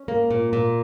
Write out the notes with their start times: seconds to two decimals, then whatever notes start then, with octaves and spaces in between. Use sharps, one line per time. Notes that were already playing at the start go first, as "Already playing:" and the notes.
Already playing: C#4
0.08 A#3
0.30 A#2
0.53 A#2